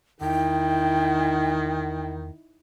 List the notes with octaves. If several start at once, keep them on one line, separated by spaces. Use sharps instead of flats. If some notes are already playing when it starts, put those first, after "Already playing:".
E2 D#3 D#4 E4 G5